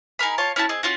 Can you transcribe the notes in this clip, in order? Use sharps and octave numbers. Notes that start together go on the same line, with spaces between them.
D#4 G#4 A#4 B5
F4 C#5 A5
C#4 E4 F#4 A5
C4 G#4 D#5
C#4 F4 F#4